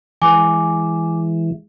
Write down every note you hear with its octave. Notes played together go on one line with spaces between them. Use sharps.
E3 G#3 G#4 G#5 D6